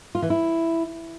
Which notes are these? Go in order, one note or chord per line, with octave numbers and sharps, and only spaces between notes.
F4
E3
E4